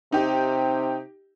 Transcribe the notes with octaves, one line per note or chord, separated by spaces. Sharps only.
C3 D#4 G4